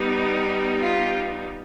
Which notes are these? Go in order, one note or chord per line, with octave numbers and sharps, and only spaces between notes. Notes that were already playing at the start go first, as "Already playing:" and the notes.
Already playing: G3 B3 D#4
F4 G4